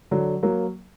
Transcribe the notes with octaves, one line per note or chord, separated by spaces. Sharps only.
D3 F#3
F#3 A#3